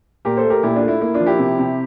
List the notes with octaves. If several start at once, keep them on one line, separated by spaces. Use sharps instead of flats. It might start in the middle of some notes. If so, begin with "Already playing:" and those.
A#2 G4 A#4
A4 C5
A3
G4 A#4
A#2 E4 G4
D4 F4
A3
E4
A#3 E4
D4 F4
F3
E4 G4
C3
C3